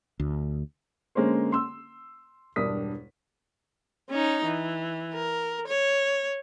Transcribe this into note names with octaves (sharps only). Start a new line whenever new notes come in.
D2
D3 G#3 A#3 C#4 C5
C6 E6
E1 G2 D4 A#4 D#6 B6
C#4 D#4
E3
A#4
C#5